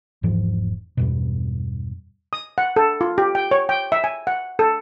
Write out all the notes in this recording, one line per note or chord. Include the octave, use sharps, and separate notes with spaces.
E1 G#2 E3 F3
E2 G2 B2
D#6
F#5
A4
F4
G4
G5
C#5
G5
E5
G#5
F#5
A4